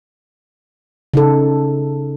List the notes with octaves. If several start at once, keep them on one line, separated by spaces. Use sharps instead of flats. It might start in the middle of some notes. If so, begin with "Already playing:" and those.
C#3 D#4 A4